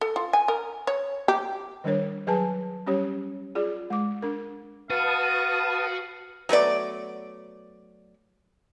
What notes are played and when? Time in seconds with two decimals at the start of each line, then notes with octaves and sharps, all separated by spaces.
0.01 A4
0.16 F4
0.33 G#5
0.48 A#4
0.87 C#5
1.28 G4
1.84 D#3 G3 D4 A#4 C#5
2.27 F#3 G#4 B4 G#5 A5
2.87 G3 C#4 G4 C#5
3.55 F4 G#4 D5
3.90 G#3 D6
4.22 D4 A#4
4.90 F#4 B4 F5 A5 D#6 D#7
6.49 F#3 A3 B3 D5